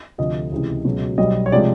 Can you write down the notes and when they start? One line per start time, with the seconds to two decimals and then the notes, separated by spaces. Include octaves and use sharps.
0.18 D2 C3 F3 A3 D#5
0.52 C#2 C3 E3
0.85 C#2 B2 F#3
1.18 B1 B2 G3 D#5
1.46 C#5
1.52 C3 F3 G#3 D5